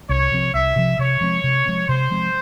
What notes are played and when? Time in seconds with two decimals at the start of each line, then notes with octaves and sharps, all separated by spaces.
0.09 C2 C#5
0.32 C3 F3 C4
0.54 C2 E5
0.76 C3 F3 C4
0.99 C3 C#5
1.21 F3 G#3 C4
1.44 C3
1.66 F3 G#3 C4
1.88 C3 C5
2.11 F3 G#3 C4